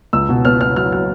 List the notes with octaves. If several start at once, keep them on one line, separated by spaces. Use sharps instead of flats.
C#2 E6
B2
B3 F6
B3 F6
F#3 F6
F#3 F6